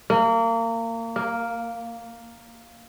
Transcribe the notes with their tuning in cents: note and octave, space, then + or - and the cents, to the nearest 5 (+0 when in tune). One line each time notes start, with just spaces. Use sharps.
A#3 -30
A#3 +0